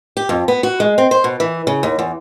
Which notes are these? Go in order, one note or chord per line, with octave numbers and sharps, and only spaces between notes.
G4
F2
B3
F#4
G#3
C4
C5
B2
E3
C#3
D#2
E2